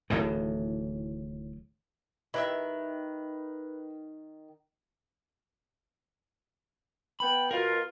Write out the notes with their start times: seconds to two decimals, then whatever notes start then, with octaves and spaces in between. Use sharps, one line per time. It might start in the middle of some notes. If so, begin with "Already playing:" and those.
0.10 D1 A2 D#3 E3
2.34 D#3 E4 G4 B4 E5 B5
7.20 B3 G5 B5
7.51 B2 F4 A#4